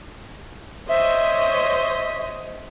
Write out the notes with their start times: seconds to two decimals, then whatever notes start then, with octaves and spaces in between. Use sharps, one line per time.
0.89 C5 C#5 D#5 E5